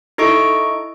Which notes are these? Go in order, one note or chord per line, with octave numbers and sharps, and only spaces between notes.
D#4 E4 A4 D#5 C#6 D7